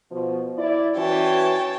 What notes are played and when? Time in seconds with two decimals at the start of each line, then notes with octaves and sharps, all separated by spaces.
0.11 B2 F3
0.58 E4 D5
0.96 E3 C#4 F#4 C#5 G5 A5